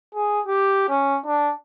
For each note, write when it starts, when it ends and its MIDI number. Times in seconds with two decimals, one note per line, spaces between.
0.15 0.41 68
0.46 0.87 67
0.89 1.19 61
1.26 1.53 62